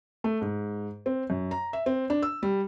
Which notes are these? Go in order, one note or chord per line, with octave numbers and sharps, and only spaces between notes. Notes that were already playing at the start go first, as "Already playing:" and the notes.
A3
G#2
C4
F#2
A#5
E5
C4
D4
E6
G3